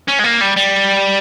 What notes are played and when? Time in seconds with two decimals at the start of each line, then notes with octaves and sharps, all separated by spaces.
0.08 C#4
0.19 G#3
0.24 A#3
0.41 G3
0.57 G3